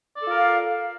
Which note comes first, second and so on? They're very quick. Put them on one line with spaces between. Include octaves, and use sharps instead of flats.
D5 A4 F4 A#4 F5